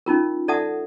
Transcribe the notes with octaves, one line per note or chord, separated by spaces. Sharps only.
C#4 D#4 F4 A#4
A4 D5 E5 F#5 A5 D#6